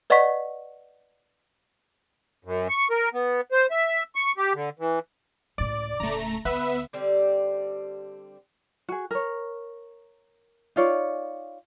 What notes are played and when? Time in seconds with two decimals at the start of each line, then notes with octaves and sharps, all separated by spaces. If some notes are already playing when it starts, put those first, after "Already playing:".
0.10 B4 D5 D#5 F#5 C#6 B6
2.45 F#2
2.69 C#6
2.91 A#4
3.14 B3
3.52 C5
3.71 E5
4.15 C#6
4.37 G4
4.54 D3
4.79 E3
5.58 C#2 A2 D5
6.00 D1 C#3 A3 A#5
6.45 D2 B3 B4 E5
6.93 D3 G3 C4 G4
8.89 F#4 G#4
9.11 A#4 C#5
10.76 D#4 F4 C#5 D5